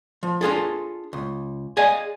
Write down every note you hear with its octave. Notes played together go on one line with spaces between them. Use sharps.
F3
D4 F4 G#4 A4
C#2
G#4 D5 D#5 F5 G#5